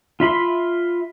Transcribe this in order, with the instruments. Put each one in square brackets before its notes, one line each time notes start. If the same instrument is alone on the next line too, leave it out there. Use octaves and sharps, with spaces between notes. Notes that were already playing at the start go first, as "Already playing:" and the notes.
[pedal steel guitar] F4 E5 B5 C6